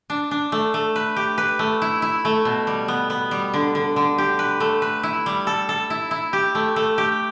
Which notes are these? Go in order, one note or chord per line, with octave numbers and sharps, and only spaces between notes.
D4
D4
A3
A3
B4
G4
B4
A3
E4
E4
A3
B2
G3
B3
B3
G3
D3
D3
D3
G4
B4
A3
B4
E4
G3
A4
A4
E4
E4
G4
A3
A3
G4